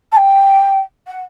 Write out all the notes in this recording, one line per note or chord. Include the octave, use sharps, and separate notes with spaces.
A5
G5
F#5